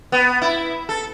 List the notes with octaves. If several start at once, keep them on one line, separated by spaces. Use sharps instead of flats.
B3
E4
A4